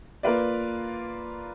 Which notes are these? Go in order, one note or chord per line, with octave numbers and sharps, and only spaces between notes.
A#3 F4 B4 D5